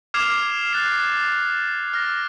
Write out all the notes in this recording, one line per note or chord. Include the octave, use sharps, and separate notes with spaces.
D6 F6 G#6 C7 E7 F7
F#6 A6 C7
F6 A#6